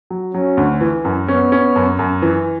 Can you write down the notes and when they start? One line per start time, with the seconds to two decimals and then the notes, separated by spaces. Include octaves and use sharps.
0.10 F#3
0.34 F#3 C#4
0.57 D2
0.81 E3
1.05 F#2
1.28 B3 C#4
1.52 C#4
1.76 F#2
1.99 F#2
2.22 E3